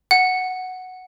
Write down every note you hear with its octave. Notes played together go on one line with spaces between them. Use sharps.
F#5